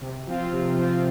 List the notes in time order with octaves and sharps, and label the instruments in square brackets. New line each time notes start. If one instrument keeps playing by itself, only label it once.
[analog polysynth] C3
F3 C4 F4
C3
F3 C4 F4